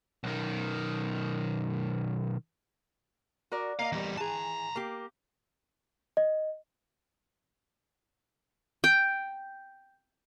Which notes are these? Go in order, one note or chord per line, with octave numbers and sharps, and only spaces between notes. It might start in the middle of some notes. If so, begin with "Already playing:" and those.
B1 D#3
F#4 A#4 D5
A#3 D#5 F5
E2 G3
E3 G#4 A5 A#5
A#3 G4
D#5
G5